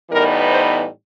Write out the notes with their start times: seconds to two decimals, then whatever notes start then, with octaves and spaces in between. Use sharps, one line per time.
0.10 A2 E3 G3 B3 D#4 A#4
0.49 C5